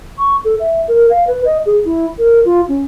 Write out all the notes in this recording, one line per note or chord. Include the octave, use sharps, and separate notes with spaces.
C#6
A4
E5
A#4
F5
B4
D#5
G#4
E4
A#4
F4
C#4